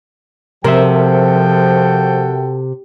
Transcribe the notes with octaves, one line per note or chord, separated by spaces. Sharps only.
C3 F3 F#4 A4 A#4 C5 E5 G5